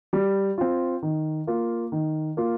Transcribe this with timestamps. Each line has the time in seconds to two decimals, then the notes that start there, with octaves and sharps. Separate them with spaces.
0.13 G3
0.58 C4 F4
1.02 D#3
1.47 A#3 F4
1.92 D#3
2.37 A#3 F4